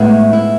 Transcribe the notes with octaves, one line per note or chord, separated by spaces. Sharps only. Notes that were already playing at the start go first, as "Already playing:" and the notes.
Already playing: A2 G#3 B3 E4
E4